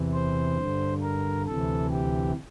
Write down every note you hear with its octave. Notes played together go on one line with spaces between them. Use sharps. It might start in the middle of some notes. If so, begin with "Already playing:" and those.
Already playing: E2 C3 E3
C5
G2 D3
A#4
D2 C3 E3 A4
G4